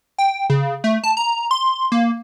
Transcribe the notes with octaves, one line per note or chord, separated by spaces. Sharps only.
G5
C#3
A3
A5
A#5
C6
A#3